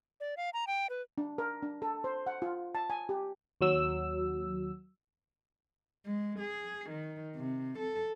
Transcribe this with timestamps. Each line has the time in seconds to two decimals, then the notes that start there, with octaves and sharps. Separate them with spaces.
0.20 D5
0.37 F5
0.54 A#5
0.67 G5
0.90 B4
1.18 D4
1.38 A#4
1.63 D4
1.82 A4
2.04 C5
2.27 F#5
2.42 F4
2.75 A5
2.90 G#5
3.09 G4
3.61 D#2 F#3 E6
6.06 G#3
6.39 G#4
6.90 D#3
7.35 C3
7.78 A4